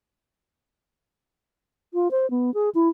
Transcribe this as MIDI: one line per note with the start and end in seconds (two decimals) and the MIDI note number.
1.94 2.08 65
2.11 2.29 72
2.30 2.53 59
2.54 2.69 68
2.75 2.89 64